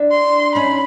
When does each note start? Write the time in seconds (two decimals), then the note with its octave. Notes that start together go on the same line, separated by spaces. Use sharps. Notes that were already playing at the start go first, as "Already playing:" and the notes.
Already playing: D4 E4
0.11 C6
0.55 C#4 D#4 B5